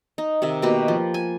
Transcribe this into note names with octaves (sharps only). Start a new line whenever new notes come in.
D#4
C3 D#3 E5
B2 A#3 G4 B4
F3
G#5